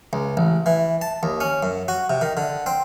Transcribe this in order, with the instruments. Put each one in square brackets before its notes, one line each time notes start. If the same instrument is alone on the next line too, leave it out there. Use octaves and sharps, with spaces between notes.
[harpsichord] C#2
A1
E3
A5
D#2
C#4
F#2
F#4
C3
D#3
D3
C4